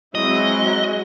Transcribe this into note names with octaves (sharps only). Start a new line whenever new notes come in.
F#3 G#3 C4 E4 D#5